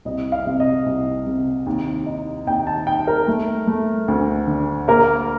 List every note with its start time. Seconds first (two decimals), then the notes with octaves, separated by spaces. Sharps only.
0.05 C2 D#5
0.32 F5
0.47 C3
0.60 D#5
0.86 C2
1.27 C3
1.66 D#2
2.06 D#4
2.47 D#2 G5
2.67 A5
2.87 D#4 G5
3.07 A#4
3.28 A3
3.67 A3
4.08 D2
4.47 D3
4.88 A#3 A#4